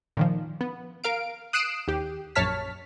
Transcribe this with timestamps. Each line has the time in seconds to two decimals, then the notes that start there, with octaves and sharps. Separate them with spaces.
0.17 A#2 D#3 F3
0.61 B3
1.04 A#4 F5 D7
1.53 D#6 F#6 C7 D7 E7
1.88 D#2 G4
2.35 A#1 F#2 C#5 A5 F6 B6